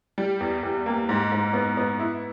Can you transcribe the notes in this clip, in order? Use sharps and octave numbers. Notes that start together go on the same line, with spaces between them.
G3
E2
E2
A#3
G#2
G#2
B3
B3
E4